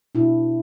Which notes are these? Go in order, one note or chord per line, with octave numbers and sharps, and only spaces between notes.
B2 D4 E4